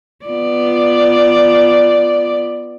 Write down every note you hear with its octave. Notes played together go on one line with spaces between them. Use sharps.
B3 F4 D5